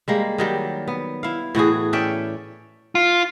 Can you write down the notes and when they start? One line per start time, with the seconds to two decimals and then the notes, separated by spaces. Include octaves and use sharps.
0.08 G3 G#3 A#3
0.38 D#3 F#3 G3
0.88 B3
1.23 E4 F5
1.55 A2 E3 F#4 G#4
1.93 C#4 D5 E5 G5
2.95 F4